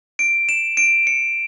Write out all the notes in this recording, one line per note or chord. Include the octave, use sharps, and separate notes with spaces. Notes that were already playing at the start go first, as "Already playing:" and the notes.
D7
E7
D7
C#7